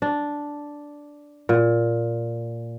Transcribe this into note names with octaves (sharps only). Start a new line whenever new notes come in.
D4
A#2